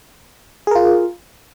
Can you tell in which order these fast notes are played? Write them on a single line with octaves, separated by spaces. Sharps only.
G#4 A#4 F4